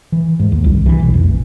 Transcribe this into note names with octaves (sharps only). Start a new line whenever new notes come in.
E3
G#2
D#2
C2
E3
B1
F1
A#1